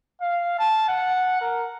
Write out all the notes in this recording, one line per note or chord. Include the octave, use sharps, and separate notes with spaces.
F5
A5
F#5
A#4